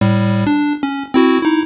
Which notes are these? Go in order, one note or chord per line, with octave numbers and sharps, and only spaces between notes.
A2 G3
D4
C#4
C4 E4 F#4
D#4 E4